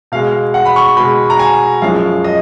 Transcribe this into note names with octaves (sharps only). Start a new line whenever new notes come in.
B2 G#3 F5
F#5
B5
C#6
B2 G#3 B5
A#5
G#5
F#2 F3 G#3 F5
D#5